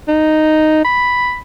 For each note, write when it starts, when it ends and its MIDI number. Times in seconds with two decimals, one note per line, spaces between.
0.08 0.80 63
0.85 1.38 83